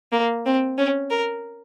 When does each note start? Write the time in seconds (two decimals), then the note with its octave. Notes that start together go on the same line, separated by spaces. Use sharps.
0.12 A#3
0.45 C4
0.77 C#4
1.10 A#4